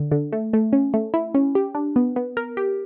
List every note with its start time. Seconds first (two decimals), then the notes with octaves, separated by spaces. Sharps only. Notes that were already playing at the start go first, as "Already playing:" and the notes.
Already playing: D3
0.12 D3
0.32 A3
0.53 A3
0.73 C#4
0.94 A3
1.14 E4
1.35 C#4
1.55 G4
1.75 D4
1.96 B3
2.16 B3
2.37 A#4
2.57 G4